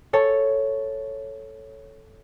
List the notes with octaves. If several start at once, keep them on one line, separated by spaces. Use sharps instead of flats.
A4 C#5 A5